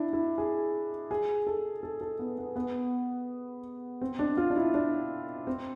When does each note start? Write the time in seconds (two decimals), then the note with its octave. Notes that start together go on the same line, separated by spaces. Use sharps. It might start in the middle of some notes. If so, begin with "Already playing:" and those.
Already playing: D4 E4
0.13 E4
0.38 G#4
1.11 G#4
1.47 A4
1.83 A4
2.01 A4
2.19 B3
2.38 B3
2.56 B3
4.02 C4
4.19 D4
4.37 F4
4.50 D4
4.56 E4
4.74 D4
5.47 C4